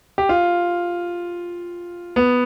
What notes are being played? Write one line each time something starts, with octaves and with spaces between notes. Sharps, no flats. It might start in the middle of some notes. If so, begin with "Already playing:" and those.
G4
F4
B3